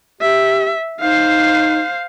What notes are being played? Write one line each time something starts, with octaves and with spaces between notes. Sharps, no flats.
G4 E5
D#4 C5 F5